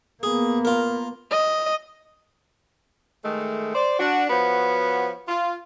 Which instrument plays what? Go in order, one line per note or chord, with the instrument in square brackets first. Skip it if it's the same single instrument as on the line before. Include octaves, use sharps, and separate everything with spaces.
[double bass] A#3 B3 [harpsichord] G#4
[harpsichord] F4 A#4
[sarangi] D#5
[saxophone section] D#3 G#3 A3
C5 D5
D4 F#4
F3 B3 F#4 C#5
F4